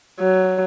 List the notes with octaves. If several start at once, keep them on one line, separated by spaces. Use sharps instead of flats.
F#3